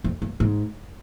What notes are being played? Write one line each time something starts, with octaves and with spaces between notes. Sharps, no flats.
F2
G2
G#2